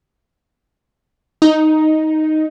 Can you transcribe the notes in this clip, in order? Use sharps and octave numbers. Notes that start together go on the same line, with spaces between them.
D#4